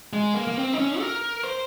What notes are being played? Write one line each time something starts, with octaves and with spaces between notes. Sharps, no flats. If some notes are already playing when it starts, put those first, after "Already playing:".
G#3
A#3
A#3
C4
D#4
C#4
A#4
C5